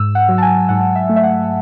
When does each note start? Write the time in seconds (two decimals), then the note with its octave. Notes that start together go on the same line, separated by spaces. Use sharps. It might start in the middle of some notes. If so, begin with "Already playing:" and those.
Already playing: G#2 E6
0.15 F#5
0.29 F#3
0.38 A5
0.42 G#5
0.69 G#2 F#5
0.95 E5
1.09 A3
1.16 E5
1.24 F#5